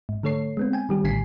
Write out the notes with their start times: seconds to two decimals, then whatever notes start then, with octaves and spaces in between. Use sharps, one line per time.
0.09 G#2
0.23 D3 A3 A4 C#5 C7
0.57 G#3 B3 C4
0.73 G5 G#5
0.89 D#3 G3 G4
1.04 A#1 A2 D3 G#5 B6 C7